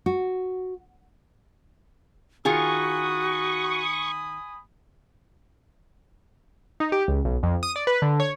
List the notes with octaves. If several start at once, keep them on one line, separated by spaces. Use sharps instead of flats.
F#4
D#3 F4 F#4 G#4 G#5 B5 C#6 D#6
D#4
G4
C#2
B1
F2
D#6
D5
B4
D3
C#5